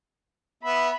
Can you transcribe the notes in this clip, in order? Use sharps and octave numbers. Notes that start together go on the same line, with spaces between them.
B3 E5 B5